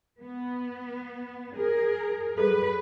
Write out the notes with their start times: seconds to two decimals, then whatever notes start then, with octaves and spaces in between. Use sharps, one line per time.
0.21 B3
1.56 G#4 A#4
2.38 F#3 G3 G#4 A4 B4